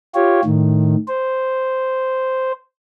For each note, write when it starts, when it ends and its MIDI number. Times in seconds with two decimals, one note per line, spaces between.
0.15 0.41 65
0.15 0.41 67
0.15 0.41 73
0.45 0.96 45
0.45 0.96 51
1.08 2.52 72